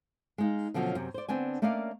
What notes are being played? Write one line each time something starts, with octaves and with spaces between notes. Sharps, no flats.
G#3 D#4 F5
B2 D3 F3 F#3 C#4 F4
F#2 C3
C5 D5
D3 B3 C4 D4 G#5
A3 A#3 C#4 D5 D#5 F5